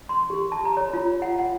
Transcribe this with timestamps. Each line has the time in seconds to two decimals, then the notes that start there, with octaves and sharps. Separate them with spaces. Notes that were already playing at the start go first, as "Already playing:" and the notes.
0.09 C6
0.30 G4
0.52 A5
0.65 A#5
0.77 C#5
0.94 F4
1.22 F#5
1.39 F#5